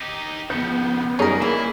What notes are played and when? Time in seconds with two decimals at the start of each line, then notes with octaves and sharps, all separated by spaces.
0.02 D#4 G4
0.50 F2 C#3 B3 G6 C#7
1.19 F#2 G3 D#4 G#4 A#4 C#5
1.42 E3 A#3 E4